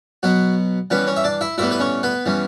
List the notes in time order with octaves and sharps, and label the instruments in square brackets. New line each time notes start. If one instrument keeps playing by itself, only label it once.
[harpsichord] B2 F#3 B3 F#4
E3 G3 B3 C#4 B4
C#4 C#5
E5
D4 D5
E4 E5
A2 E3 G3 B3 E4 E5
B4
C#4 C#5
B3 B4
E3 G3 C#4